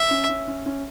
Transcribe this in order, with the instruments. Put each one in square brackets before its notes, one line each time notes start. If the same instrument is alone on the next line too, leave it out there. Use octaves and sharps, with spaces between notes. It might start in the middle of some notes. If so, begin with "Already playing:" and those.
Already playing: [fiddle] E5
[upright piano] C#4
C#4
C#4
C#4